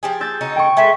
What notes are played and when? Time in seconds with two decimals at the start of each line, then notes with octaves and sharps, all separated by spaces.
0.03 F3 G4 G#4
0.20 E6 G6 A6
0.41 C#3 D#4 F#4
0.56 G5 C#6
0.77 G#3 A4 B4 E5